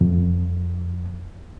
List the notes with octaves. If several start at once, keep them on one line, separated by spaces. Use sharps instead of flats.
F2